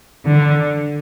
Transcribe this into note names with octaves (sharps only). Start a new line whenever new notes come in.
D3